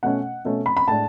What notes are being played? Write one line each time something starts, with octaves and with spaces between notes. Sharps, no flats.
B2 A3 C#4 F#5
B2 A3 C#4
B5
B5
A2 G#3 D4 A5